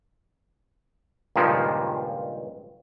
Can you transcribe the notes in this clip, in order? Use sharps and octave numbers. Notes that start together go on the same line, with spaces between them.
C#2 G2 A#2 D#3 F3 G#3